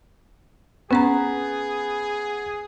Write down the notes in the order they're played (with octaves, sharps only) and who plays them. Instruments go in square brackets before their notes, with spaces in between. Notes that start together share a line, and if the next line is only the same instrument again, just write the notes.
[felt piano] B3 [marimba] C#4 B4 A#5 [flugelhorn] G#4